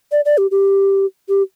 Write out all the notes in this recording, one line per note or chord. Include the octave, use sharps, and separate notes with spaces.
D5
D5
G4
G4
G4